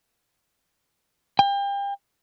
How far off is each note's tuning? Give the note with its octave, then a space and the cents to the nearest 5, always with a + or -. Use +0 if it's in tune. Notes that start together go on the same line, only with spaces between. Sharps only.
G5 +35